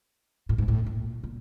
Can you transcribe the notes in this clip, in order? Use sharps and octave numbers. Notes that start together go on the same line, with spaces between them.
A2
G#2
A2
A#2
A#2